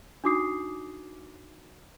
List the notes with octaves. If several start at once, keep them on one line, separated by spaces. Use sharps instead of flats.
D4 D#4 F#4 D6 D#6 C7